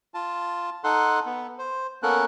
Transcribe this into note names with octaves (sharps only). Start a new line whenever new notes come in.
F4 A5
D#4 A4 F#5 C6
B3
C5
A#3 B3 C#4 A4 A#4 F#6